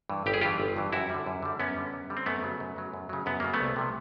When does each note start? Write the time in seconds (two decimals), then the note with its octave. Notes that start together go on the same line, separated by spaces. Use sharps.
0.10 G2 E3
0.26 G1 G4
0.34 G#4
0.41 G2 E3 F4 G4
0.60 G1
0.76 G2 E3
0.92 F#2 E4 F#4
1.10 D3 G3
1.26 F#2
1.43 D3 G3
1.59 F#2 B3 C#4
1.76 D3 G3
1.93 F#2
2.10 D3 G3
2.17 C4
2.26 F#2 A3 B3
2.43 C#3 F#3
2.60 F#2
2.76 C#3 F#3
2.93 F#2
3.09 C#3 F#3
3.26 F#2 B3
3.40 C#3 F#3 A#3
3.54 A3 B3
3.60 C2
3.76 C3 F3